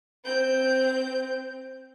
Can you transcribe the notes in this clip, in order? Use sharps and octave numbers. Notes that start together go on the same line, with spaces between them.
C4 G6